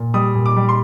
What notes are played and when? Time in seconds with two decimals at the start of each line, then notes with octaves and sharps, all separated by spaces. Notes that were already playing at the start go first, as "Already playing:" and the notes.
Already playing: A#2
0.14 G3 D#6
0.35 A#2
0.46 D6
0.56 G3
0.69 C6